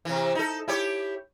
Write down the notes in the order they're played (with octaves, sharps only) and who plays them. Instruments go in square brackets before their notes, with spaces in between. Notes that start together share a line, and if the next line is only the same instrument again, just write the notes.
[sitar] C3 E3
D#4 A4
E4 G4 C#5